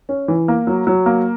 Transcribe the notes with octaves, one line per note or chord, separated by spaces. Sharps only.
C#4
E3
A#3
F#3
F#3
A#3